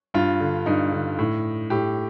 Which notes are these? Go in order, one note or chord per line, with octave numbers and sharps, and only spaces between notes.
G2 F4
D3
G2 D#4
D3
A2
A2 G4